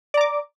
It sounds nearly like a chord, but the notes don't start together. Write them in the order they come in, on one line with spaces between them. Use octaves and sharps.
D5 A#5 D6